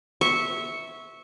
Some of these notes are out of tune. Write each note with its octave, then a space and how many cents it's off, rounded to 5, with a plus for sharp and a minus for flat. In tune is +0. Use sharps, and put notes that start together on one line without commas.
E5 -15 C#6 +0